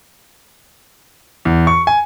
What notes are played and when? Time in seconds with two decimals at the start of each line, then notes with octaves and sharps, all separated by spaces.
1.45 E2
1.67 C#6
1.87 G#5